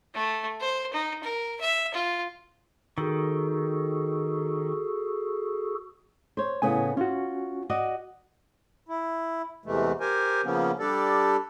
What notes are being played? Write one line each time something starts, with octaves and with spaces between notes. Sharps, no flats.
A3
C5
D#4
A#4
E5
F4
D#3 F#4 G#4 A4
C5 C#5
A2 C#3 B3 G#5
C#4 F4 F#4
F#4 D5 D#5
E4
E2 C3 E3 G#3 A3
G4 A#4 C5 G#5
C#3 F3 A#3 B3 C#4
G3 D4 G4 A4 D5